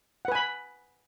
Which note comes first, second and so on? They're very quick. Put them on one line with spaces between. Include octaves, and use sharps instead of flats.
F#5 B4 G#5 B5